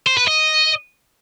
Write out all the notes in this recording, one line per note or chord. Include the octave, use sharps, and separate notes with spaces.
C5
B4
D#5